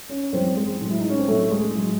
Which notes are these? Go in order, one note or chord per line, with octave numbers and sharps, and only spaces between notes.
C#4
F#2 E3 G#3 C4
G#3
A2 F#3
E4
D#4
C#4
C4
A2 F#3 A3
G#3
A2 F#3